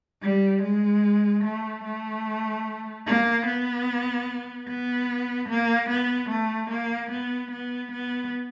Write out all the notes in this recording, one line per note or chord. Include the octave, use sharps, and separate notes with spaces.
G3
G#3
A3
A3
A#3
B3
B3
A#3
B3
A3
A#3
B3
B3
B3